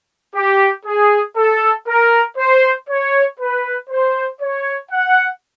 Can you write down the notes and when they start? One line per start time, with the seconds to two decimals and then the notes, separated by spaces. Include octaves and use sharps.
0.35 G4
0.85 G#4
1.36 A4
1.87 A#4
2.37 C5
2.89 C#5
3.39 B4
3.90 C5
4.41 C#5
4.91 F#5